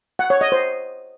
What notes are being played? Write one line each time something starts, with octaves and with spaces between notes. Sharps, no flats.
F#5
C#5
D#5
C5